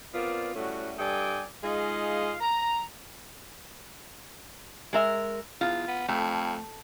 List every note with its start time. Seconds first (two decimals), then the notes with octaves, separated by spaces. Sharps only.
0.14 B3 C4 F4 A#4 D5
0.55 A2 G3 A3 C#4 F#4
0.98 G2 A4 D5 D#5 G5 G#5
1.62 G#3 D#4 F4 G#4 D#5 F5
2.40 A#5
4.93 G#3 A#4 E5
5.61 E2 F4
5.88 B3
6.08 F2 A3